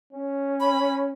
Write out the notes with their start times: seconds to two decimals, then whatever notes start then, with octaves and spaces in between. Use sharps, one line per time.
0.13 C#4
0.60 B5